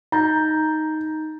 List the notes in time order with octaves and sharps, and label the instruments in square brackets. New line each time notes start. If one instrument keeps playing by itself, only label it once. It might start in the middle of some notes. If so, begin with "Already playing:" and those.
[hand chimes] D#4 G6 [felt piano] A#5